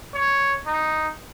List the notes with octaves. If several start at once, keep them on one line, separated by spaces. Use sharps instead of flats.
C#5
D#4